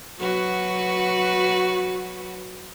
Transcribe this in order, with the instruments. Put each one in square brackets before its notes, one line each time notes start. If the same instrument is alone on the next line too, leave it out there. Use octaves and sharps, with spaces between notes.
[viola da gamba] F#3 F#4 B4